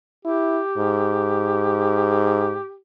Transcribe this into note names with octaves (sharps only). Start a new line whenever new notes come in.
E4 G4
G#2